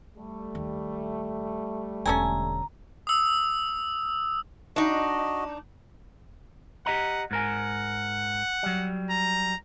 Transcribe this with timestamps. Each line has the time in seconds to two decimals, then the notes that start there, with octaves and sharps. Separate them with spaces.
0.17 G3 A3
0.55 D#2
2.06 E1 D3 C#4 A4 G#5 A#5
3.07 D#6 E6
4.76 D4 D#4 F#4 D#5
6.86 G4 D#5 F#5 A#5
7.31 G#2 A#4 F#5 G#5
8.63 F#3 G3
9.11 A#5